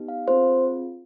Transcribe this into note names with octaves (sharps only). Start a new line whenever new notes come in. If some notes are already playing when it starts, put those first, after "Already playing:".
Already playing: B3 D#4 G4
F5
C4 F4 G#4 C5